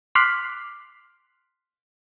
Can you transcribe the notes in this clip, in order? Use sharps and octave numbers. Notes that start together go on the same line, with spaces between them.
C6 D6 F6 F#6 B6 C7